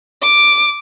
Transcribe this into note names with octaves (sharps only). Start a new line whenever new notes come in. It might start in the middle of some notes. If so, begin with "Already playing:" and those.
D6